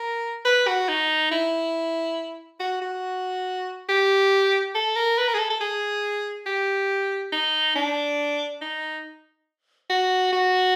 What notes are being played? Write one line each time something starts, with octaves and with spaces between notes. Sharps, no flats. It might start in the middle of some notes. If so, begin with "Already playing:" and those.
Already playing: A#4
B4
F#4
D#4
E4
F#4
F#4
G4
A4
A#4
B4
A#4
G#4
A4
A4
G#4
G4
D#4
D4
D#4
F#4
F#4